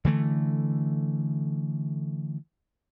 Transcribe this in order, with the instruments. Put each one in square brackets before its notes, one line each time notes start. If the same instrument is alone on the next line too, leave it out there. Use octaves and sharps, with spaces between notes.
[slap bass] D3 E3 A3